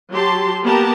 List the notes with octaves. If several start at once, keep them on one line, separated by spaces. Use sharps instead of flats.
F#3 G4 A5 C6
A#3 B3 G4 A#4 A5 A#5